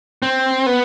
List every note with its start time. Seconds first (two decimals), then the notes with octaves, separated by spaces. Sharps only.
0.22 C4
0.66 B3